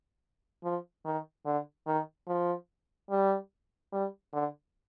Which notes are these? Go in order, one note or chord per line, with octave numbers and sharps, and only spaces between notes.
F3
D#3
D3
D#3
F3
G3
G3
D3